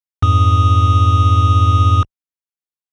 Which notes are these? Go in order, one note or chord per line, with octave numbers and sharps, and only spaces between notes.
F2 G#2 D#6